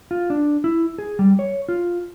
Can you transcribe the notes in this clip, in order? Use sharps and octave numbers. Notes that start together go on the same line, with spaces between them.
F4
D4
E4
G#4
G3
C#5
F4